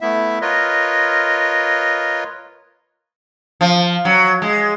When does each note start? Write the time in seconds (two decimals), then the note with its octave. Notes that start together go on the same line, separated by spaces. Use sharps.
0.01 A3 B3 E4 E5
0.42 F4 A#4 B4 C#5 D#5
3.61 F3
4.05 F#3
4.42 G#3